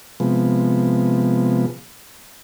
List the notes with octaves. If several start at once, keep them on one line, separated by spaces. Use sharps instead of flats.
C3 F3 G#3 B3